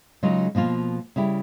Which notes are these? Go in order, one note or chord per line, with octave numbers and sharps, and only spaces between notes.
C#3 F#3 G#3 D#4 F4
B2 F3 A#3 F4
C#3 G3 E4 G4